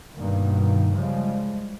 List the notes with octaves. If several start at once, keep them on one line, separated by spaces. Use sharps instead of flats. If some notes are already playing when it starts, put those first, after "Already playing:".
G1 G2 B2 D#3 A#3
C#3 F3 G3 G#3